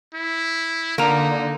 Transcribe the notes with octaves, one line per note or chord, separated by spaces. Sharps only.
E4
D3 A#3 D#4 F4 D5 A#5 D7